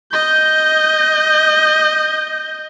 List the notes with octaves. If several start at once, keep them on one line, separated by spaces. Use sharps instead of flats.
D#5 G6